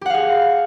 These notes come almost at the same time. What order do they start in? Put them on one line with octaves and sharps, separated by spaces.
G4 F#5 F5 G#4